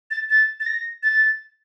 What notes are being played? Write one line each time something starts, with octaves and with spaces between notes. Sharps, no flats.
A6
A6
A6
A#6
A6